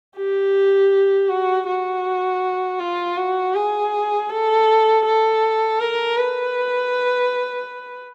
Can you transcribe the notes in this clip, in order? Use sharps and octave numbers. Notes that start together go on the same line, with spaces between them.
G4
F#4
F#4
F4
F#4
G#4
A4
A4
A#4
B4